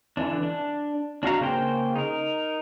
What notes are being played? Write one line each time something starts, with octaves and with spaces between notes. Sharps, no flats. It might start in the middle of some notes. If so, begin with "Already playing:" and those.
D3 E3 D4
D4
D4 F#4 F5 A#5
C#3 A#3 C5 G5
D#4 A#4